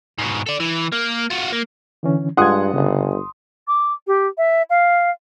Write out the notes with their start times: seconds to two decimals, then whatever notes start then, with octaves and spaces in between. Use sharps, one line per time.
0.18 G#2 B2
0.46 A4 D5
0.60 E3
0.92 A#3
1.30 F4 F#4
1.52 A#3
2.03 D3 E3 C#4
2.37 G2 G#3 F4 F#5 C6 D#6 F#6 G#6
2.74 G1 C#3
3.68 D6
4.07 G4
4.38 E5
4.70 F5